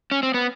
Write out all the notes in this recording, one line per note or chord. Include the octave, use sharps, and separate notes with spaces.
C#4
C4
B3